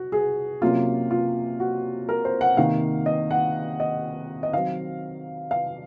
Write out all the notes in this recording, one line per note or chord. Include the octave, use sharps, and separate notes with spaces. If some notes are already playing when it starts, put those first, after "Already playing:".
Already playing: F#4
G#4
C3 F#3 A#3 C#4 F4
F4
F#4
A#4
C5
F#5
C3 D#3 A#3 F5
D#5
F#5
D#5
D#5
D#3 F#3 C4 F5
F5